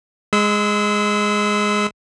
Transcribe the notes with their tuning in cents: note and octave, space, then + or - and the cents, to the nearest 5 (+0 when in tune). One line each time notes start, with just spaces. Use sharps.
G#3 +0 C6 -35 E6 -25